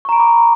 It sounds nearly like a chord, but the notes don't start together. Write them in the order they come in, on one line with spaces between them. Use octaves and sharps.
C#6 A#5 D7 B5 D6